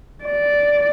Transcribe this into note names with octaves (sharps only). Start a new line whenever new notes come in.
D5